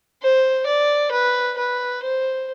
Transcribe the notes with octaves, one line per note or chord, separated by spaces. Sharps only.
C5
D5
B4
B4
C5